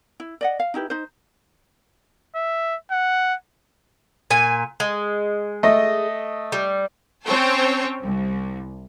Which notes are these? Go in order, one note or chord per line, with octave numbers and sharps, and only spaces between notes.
E4
D5 D#5 F#5
F5
D#4 E4 G4 B4
D#4 C5
E5
F#5
A#2 G#5
G#3
A3 D#5
G3
C4 C#4 C5 C#5 G5 A5
C2